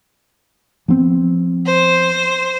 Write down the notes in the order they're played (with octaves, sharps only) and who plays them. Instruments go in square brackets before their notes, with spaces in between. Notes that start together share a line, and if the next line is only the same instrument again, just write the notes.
[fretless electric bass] F3 B3 C4
[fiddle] C5